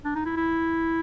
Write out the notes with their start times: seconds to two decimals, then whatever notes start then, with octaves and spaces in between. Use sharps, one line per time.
0.05 D4
0.16 D#4
0.25 E4
0.37 E4